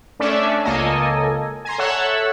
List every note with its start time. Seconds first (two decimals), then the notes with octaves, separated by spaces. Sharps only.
0.20 A3 C#4 D4 D5 E5
0.63 C#2 A#3 A4 D#5 G#5
1.65 G#5 A#5 C6
1.78 A4 C#5 E5 F#5 E6 F#6